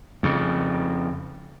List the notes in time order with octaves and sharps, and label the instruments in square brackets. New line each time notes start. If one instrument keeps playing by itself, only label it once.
[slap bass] F2 C#3